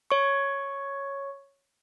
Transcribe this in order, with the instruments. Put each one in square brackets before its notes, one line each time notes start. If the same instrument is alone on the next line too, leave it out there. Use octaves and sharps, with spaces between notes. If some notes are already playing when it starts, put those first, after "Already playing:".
[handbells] C#5 C#6